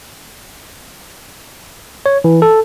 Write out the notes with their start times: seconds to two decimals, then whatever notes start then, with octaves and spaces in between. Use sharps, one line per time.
2.06 C#5
2.24 E3
2.42 A4